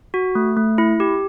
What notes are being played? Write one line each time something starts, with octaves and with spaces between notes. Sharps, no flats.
F#4
A3
A3
E4
G4